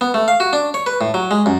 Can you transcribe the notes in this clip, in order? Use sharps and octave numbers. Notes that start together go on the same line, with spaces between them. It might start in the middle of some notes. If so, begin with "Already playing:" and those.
B3
A3
F5
F#4
D4
C#5
B4
A2
F#3
G#3
F#2